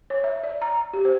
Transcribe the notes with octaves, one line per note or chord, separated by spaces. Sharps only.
C#5
E5
D5
A#5
G4
C5